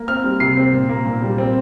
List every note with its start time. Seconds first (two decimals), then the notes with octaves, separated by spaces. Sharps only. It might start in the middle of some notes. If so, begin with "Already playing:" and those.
Already playing: A#3
0.08 C4 F6
0.24 G3
0.40 C3 C7
0.57 C4
0.73 A#2
0.89 A#3
1.06 A#2
1.22 G3
1.38 C4